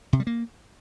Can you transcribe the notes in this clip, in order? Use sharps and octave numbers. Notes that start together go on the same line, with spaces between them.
C3
G3
A#3